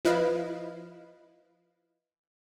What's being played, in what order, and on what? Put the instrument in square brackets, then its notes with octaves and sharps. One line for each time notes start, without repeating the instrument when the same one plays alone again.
[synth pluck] F3 E4 B4 D#5 F5